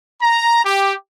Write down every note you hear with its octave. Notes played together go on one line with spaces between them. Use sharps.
A#5
G4